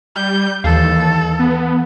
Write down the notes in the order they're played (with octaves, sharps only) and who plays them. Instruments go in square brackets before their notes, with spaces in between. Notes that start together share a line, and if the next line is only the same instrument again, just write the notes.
[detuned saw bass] G3 [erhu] G6
[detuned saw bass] D#2 [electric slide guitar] E3 F5 [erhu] A4
[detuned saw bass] B3